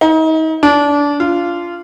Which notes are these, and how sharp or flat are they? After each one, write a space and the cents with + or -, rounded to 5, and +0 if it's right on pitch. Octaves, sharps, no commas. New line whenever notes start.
D#4 +35
D4 -25
F4 -15